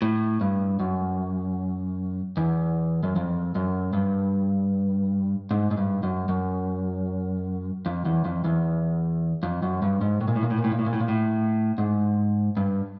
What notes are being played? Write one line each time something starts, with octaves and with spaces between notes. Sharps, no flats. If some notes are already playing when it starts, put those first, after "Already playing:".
A2
G2
F#2
E2
F#2
F2
F#2
G2
G#2
G#2
G2
F#2
F#2
F2
E2
F2
E2
F2
F#2
G2
G#2
A2
A#2
A2
A#2
A2
A#2
A2
A#2
A2
A#2
A2
A#2
A2
G#2
G2